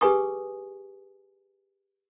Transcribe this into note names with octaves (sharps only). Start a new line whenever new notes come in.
G4 G#4 B4 G#5 C#6 D#6